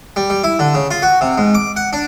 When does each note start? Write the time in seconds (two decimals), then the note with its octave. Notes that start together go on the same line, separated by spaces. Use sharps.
0.16 G3
0.30 G3
0.44 E4
0.59 D3
0.75 C#3
0.91 F4
1.02 F#4
1.21 C3
1.38 G#2
1.55 D6
1.76 F#5
1.93 D4